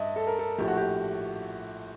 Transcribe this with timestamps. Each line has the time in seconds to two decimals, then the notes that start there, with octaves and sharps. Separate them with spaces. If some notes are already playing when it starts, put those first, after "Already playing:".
Already playing: G2 D#5 E5
0.16 A4
0.27 A#4
0.39 A4
0.58 A#1 A2 F3 A3 G4
0.68 F#4
0.77 G4